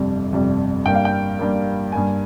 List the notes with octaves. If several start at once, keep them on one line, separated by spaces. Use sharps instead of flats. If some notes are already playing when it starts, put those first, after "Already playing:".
Already playing: G1 F2 C3 G3
G1 F2 C3 G3
G2 G3 A#3 G5
F5
G5
G2 G3 A#3
G2 G3 A#3 G#5